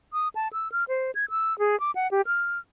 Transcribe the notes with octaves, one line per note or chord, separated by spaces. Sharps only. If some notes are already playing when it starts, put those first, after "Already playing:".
D#6
A5
E6
F6
C5
G#6
E6
G#4
D6
F#5
G4
F6